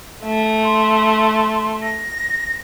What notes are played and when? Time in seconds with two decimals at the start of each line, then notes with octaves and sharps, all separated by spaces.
0.24 A3
0.64 C6
1.82 A#6